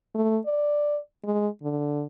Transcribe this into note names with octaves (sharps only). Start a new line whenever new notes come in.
A3
D5
G#3
D3